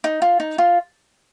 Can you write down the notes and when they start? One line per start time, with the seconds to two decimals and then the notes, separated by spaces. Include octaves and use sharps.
0.04 D#4
0.22 F4
0.40 D#4
0.58 F4